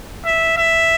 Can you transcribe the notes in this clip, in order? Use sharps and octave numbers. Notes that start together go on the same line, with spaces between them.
E5
E5